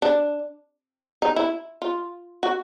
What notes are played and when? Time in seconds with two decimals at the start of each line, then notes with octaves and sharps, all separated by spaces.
0.02 D4
1.22 D#4
1.36 E4
1.82 F4
2.43 F#4